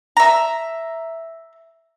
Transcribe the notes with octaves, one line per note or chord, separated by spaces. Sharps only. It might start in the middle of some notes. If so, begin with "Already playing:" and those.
E5 A#5